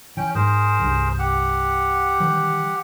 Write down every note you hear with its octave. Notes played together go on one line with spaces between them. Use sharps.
E3 C#4 G5
G#2 G#4 A#4 C5
C2 G2
G4 F#5
D#3 E3 G3